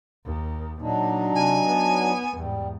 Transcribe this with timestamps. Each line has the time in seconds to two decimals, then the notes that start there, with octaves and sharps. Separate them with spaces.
0.25 D#2
0.82 A#2 F#3 D4 D#4
1.34 C3 G#5
1.66 B3
2.37 E2 G#2 G3